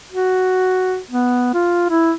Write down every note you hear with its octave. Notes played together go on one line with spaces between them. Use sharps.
F#4
B3
F4
E4